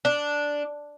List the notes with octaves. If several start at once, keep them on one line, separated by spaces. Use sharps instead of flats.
D4